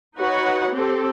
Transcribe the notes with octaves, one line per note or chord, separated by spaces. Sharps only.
D#4 F#4 B4 C#5 F#5
C4 G4 A4